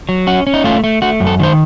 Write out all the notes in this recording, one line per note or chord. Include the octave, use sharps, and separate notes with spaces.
F#3
C#4 F#4
C#4
D#4
A3 F4
A3
A3 F#4
F#2
A4
D#3 C5